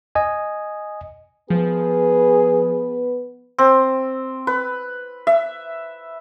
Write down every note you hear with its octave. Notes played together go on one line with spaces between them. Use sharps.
D#5 G#5
F3 B3 G#4 B4
C4
B4
E5